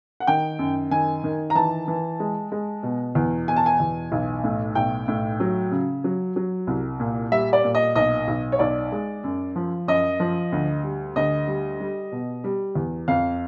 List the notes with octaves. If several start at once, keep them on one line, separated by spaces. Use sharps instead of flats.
F#5
D#3 G5
F#2
D#3 G#5
D#3
A#5
E3 A5
E3
G#3
G#3
B2
E2
B2 G#5
A5
G#5
E2
B1
A2
B1 G5
A2
F#3
C#3
F#3
F#3
C2
A#2
G3 E5
D5
A#2
D#5
B1 D#5
B1
C#5
B1 D5
G#3
F#2
F3
F#2 D#5
F3
D2
G3
D2 D#5
G3
G3
B2
G3
E2
F2 F5